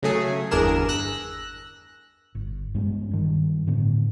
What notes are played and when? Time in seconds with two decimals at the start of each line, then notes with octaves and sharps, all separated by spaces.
0.03 C#3 F#3 A3 G#4
0.51 G1 E2 D4 G#4 A#4 E7
0.89 E6 F#6 A#6
2.35 G1
2.74 G2 G#3 B3 C#4
3.11 G2 D#3
3.67 A2 D3 B3